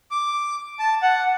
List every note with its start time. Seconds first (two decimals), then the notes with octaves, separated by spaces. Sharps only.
0.11 D6
0.79 A5
1.03 F#5